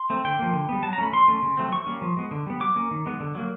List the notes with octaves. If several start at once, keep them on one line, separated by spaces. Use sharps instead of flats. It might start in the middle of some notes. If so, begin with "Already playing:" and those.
Already playing: C6
A3 C4
D3 G5
F3 A#3
D3
G3 B3
F#3 A5
A#5
A3 C#4 B5
E3 C6
A3 C#4
C#3
F#3 A3 C4
E3 C#6
G3 A#3 C#4
F3
G#3 B3
D3
G3 B3
F#3 D6
A#3 C#4
D#3
G#3 B3
D3
F#3 A#3